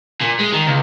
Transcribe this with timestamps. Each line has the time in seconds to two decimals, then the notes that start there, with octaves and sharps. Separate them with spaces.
0.21 A#2
0.39 G#3
0.52 D#3
0.66 C#2